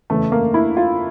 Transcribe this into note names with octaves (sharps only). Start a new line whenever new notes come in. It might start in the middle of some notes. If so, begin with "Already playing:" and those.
F#1 E2 C#3 E3 A3
A#3
E4
F4